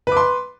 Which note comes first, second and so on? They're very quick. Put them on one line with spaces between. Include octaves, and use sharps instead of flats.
B4 D6 C6